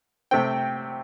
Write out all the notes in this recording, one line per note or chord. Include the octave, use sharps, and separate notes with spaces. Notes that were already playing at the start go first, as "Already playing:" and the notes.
C3 A3 C4 G5